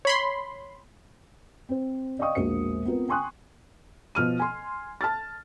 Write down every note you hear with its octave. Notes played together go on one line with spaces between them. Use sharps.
C#5 B5 C6
C4 C5
D5 D#5 F5 G5 C#6 D#6
E1 A#1 A#3 F#4 C5 C#7
B3 C4 F4 A#4 B4
G5 G#5 C6 C#6 D#6 F#6
B2 F3 F6 D#7
G#5 C6
A5 F6 A6